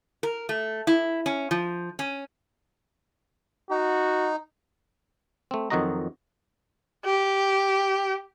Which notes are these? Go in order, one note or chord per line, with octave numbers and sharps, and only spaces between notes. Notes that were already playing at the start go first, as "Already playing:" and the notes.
A#4
A3
E4
C#4
F3
C#4
D#4 F#4
A3 C4
F2 D#3 F#3 F#4 D#5 A#5
G4